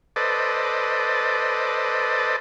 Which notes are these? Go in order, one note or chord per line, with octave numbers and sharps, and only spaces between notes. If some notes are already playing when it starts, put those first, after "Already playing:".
A4 B4 C5 D5 D#5